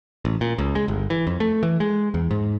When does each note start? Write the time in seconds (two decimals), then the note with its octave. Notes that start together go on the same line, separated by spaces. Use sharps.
0.25 A1
0.41 A#2
0.58 C#2
0.75 G#3
0.88 G1
1.10 E3
1.27 F2
1.40 A3
1.63 E3
1.80 G#3
2.14 E2
2.31 G#2